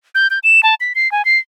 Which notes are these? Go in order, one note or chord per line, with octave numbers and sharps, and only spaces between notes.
G6
G6
E7
A5
B6
C7
G#5
C7